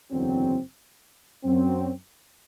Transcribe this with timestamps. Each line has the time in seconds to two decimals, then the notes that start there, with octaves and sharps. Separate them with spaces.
0.11 F#1 E2 D3 F#3 C4
1.44 F#2 F#3 C4